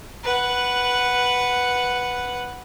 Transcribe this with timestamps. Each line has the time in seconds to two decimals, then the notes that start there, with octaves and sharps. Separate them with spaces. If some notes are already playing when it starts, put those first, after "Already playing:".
0.24 B4 F#5